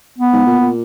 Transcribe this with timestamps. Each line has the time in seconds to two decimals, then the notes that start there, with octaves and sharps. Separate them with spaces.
0.18 B3
0.33 G#2
0.47 A#2
0.61 A#2